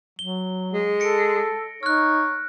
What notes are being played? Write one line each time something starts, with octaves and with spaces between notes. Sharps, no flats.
F#3 G7
G#3
A4 A#6 C#7 D7
D#4 C#5 F6 F#6